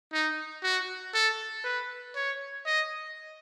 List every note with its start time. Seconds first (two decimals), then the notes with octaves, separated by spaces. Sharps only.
0.13 D#4
0.63 F#4
1.14 A4
1.64 B4
2.16 C#5
2.66 D#5